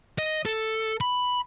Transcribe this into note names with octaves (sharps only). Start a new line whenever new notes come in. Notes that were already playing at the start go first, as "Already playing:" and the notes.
D#5
A4
B5